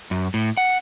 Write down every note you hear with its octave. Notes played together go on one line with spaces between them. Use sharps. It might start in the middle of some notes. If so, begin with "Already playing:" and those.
F#2
A2
F#5